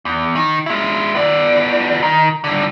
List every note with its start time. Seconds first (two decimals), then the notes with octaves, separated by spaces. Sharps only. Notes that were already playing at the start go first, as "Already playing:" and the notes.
0.05 E2
0.35 D#3
0.66 G#3 E4
1.15 B3 D5
2.02 D#3
2.44 D3 G3